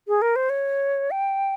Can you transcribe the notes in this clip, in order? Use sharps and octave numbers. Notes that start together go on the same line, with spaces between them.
G#4
A#4
C5
C#5
G5